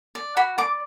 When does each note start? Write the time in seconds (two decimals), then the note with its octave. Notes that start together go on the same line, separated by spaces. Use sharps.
0.15 D5
0.37 F#4 B5
0.58 D5 D6